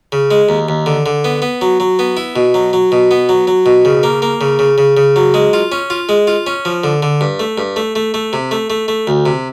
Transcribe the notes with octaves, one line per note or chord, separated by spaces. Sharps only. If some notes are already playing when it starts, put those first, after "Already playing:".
C#3
G#3
D#2
D#2
D3
D3
B3
B3
F#3
F#3
B3
E4
B2
F#3
F#3
B2
B3
F#3
F#3
B2
C#3
A#3
A#3
C#3
C#3
C#3
C#3
F#3
G#3
F4
C#4
F4
G#3
F4
C#4
F3
D3
D3
G2
A3
G2
A3
A3
A3
C3
A3
A3
A3
D2
C3